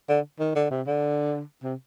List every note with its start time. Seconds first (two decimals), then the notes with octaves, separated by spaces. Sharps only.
0.09 D3
0.40 D#3
0.55 D3
0.71 C3
0.87 D3
1.63 C3